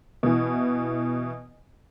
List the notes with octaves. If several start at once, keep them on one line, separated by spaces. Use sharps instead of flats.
B2 E3